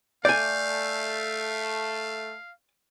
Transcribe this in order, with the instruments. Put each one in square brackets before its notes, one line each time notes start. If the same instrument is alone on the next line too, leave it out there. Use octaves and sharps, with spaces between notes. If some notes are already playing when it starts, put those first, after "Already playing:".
[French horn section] A3 [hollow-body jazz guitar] D5 G#5 [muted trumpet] F5 [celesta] G6